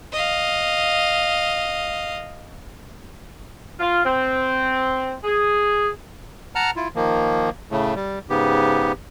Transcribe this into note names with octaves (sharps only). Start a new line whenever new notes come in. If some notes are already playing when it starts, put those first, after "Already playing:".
D#5 F5
F4
C4
G#4
F#5 A5 A#5 F6
E4 F4
D#3 F3 A#3
A2 C#3 A3
G3
G#2 C#3 B3 G4